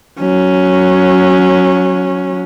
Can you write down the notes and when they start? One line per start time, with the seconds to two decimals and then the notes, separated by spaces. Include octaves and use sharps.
0.20 F#3 C#4